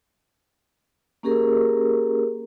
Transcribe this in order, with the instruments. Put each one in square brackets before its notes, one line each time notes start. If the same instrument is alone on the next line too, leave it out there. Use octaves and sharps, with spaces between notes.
[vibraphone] A#3 C#4 G4 G#4 A#4